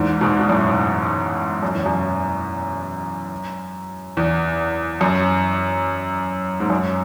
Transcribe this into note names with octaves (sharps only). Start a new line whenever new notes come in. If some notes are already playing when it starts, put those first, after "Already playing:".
Already playing: E2 G#2
G#2 B2
B2
F#2 A2
F#2
E2
F#2
E2
F#2
G#2
F#2